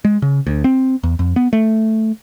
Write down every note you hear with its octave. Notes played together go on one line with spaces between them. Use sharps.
G#3
C#3
D2
C4
E2
F2
B3
A3